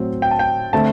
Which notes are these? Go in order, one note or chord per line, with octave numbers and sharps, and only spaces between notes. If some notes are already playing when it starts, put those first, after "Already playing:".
Already playing: A2 F#3 C4
G5
A5
G5
D3 A3 C4 A5